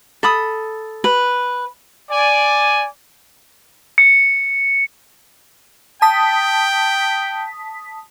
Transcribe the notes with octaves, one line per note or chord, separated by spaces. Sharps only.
A4 B5 D#6
B4
D5 G#5
C#7
G5 A5 D#6 B6